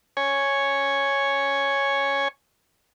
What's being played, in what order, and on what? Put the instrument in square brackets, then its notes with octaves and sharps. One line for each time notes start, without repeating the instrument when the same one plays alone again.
[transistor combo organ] C#5 G#5